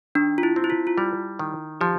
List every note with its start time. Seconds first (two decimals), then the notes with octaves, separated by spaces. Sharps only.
0.15 D#3 D4
0.38 F4
0.43 E4
0.56 C4
0.64 E4
0.70 F4
0.87 F4
0.98 G3 E4
1.39 D#3
1.81 F3 G4